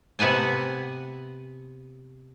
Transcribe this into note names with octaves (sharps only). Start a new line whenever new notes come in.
C3 B3 F#5 G#5 A5